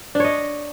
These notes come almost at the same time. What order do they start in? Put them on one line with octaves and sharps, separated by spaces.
D4 C#5 D#5